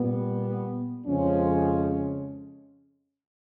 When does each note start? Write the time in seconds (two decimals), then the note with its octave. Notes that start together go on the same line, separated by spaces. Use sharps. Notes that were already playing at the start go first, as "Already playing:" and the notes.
Already playing: A#2 G3 B3
1.04 F2 C#3 F3 G#3 C#4